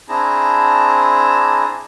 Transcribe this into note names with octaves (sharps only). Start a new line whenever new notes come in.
C4 D4 E4 G#4 A5 A#5